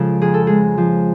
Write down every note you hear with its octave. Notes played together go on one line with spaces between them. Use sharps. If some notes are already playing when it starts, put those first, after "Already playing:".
Already playing: C#3 F3 G#3 A4
F2 G#4
A4
G#3 G#4
F3